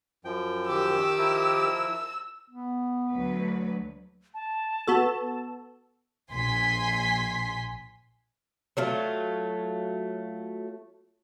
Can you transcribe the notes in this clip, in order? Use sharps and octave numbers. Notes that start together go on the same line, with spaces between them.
F#2 F3 G5
D#3 G4 D6 E6
F3 E4 A#4
B3
D2 F#3 B4
A5
B3 F#4 A4
A#1 G#5 C6 B6
F#3 A3 F4